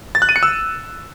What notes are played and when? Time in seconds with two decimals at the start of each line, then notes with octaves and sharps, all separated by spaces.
0.15 A6
0.22 F#6
0.29 D#7
0.36 C#7
0.43 E6